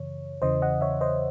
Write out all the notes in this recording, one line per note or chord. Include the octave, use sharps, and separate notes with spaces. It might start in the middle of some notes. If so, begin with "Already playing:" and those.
Already playing: F#2 C#3 E3 C#5
E2 C#3 E3 C5 D#5
D#5 F#5
C#5 E5
C5 D#5